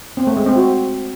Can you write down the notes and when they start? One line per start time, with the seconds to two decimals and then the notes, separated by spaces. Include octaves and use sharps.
0.17 C4
0.27 A3
0.37 G#3
0.46 C4
0.56 F#4